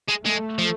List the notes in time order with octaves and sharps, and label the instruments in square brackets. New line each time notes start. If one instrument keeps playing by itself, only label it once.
[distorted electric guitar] G#3
[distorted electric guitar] G#3 [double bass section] A3
[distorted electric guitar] F3